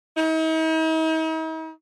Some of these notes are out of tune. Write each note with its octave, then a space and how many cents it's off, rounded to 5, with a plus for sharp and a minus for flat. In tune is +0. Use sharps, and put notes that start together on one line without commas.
D#4 +45